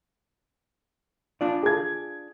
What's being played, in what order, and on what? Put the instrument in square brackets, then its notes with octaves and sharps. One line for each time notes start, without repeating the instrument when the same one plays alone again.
[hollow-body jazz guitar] D4 F4 D5
[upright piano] G#4 G#6